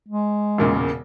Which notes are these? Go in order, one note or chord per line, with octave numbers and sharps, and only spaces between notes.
G#3
E1 A#2 C#3